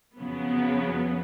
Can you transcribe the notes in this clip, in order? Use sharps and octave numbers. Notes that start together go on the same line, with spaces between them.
F2 C#3 F#3 B3